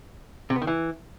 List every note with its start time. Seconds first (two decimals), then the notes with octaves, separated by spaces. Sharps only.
0.50 C3
0.56 B3
0.62 D#3
0.67 E3